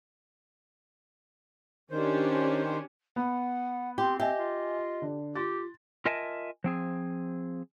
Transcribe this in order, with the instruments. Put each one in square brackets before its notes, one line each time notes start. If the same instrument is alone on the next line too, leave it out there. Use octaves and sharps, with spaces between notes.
[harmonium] D#3 C5 [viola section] C#4 D4 G4
[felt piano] B3 [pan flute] F#5
[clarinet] C4 [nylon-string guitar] G4 [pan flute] C6
[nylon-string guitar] G4 [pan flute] D#5 [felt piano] E5 G#5
[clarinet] F4
[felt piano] D3
[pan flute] F4 [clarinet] G4 [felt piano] C6 A6
[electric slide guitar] F4 A#4 D#5 E5 G#5 A5
F3 C4 G#4